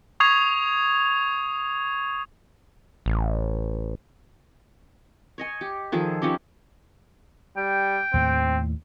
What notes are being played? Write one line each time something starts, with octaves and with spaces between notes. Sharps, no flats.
C#6 D#6 G#6 C7 F7
A1
C#5 D#5 G#5
G4
D#3 F3 G#4 A4
F3 C#4 D#4 G4
G3 G5
D#2 A2 A3 C4